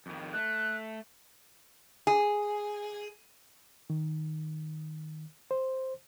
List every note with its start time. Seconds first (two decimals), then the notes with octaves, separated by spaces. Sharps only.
0.06 F2 D#3
0.33 A3 F#6
2.07 G#4
3.90 D#3
5.51 C5